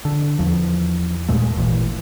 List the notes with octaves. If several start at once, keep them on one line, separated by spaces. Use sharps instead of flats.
D3
E2 F3
D#2 A#2 G#3 A3
G#1 A#2 E3